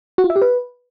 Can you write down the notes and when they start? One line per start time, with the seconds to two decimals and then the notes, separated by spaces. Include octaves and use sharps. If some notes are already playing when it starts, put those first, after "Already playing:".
0.18 F#4
0.24 F4
0.30 E5
0.36 G4
0.42 B4